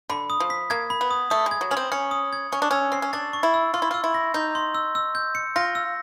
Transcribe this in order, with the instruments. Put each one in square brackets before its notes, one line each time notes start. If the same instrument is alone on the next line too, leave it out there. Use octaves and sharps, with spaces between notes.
[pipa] D3 [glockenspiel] B5
[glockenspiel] D#6
[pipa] F3
[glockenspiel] B6
[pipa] A#3 [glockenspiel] G#6
[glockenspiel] B5
[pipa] B3
[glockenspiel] D#6
[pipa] A3 [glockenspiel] D#6
[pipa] G#3
[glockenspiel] G#6
[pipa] F#3
[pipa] C#4 [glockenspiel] F#7
[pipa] C4
[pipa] C#4 [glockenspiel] C#7
[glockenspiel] D#6
G#6
[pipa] C#4 [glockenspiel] C#6
[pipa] D4
[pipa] C#4 [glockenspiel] E6
[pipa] C4 [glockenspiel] C7
[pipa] C#4
[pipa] D4 [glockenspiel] A6
[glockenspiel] C#6
[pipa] E4
[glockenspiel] E6
[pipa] F4 [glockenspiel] C6
[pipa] E4
[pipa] F4 [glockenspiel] E6
[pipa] E4
[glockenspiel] A#6
[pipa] D#4 [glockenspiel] G6
[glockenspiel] C6
E6
E6
G6
C#7
[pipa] F4 [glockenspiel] A#6
[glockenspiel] E6